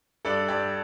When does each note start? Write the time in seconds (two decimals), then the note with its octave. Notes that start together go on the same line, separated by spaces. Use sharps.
0.25 G2 A4 D5
0.48 G2 D5 G5